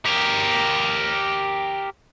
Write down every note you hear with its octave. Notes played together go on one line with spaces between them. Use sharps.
G4 A#4